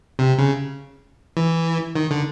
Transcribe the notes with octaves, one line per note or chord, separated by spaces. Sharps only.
C3
C#3
E3
D#3
D3